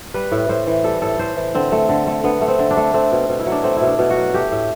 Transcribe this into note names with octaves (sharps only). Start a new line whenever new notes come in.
G3 B4
A2
A2 C5
E3
G3 A4
A2 A4
A2 C5
E3
D3 C4
A3
D3
A3
D3 B3
A3
C4
D3
D4
A3
A3 C4
B2
B2
E4
F#3
D4
A3 C4
B2 E4
D4
B2
F#4
F#3
A3 G4
A2